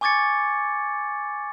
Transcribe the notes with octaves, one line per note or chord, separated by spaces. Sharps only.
G#5 C#6 D6 G#6 A6 C#7